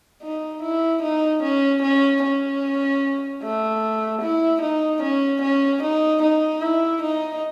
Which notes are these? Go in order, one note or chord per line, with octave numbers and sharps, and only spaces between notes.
D#4
E4
D#4
C#4
C#4
C#4
A3
E4
D#4
C#4
C#4
D#4
D#4
E4
D#4